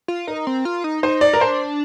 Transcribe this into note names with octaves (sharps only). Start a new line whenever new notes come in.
F4
D#4 A#4
C4
F4
D#4
D#4 C5
D5
A#4
D4 C5